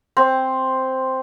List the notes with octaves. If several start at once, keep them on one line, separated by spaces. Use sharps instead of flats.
C4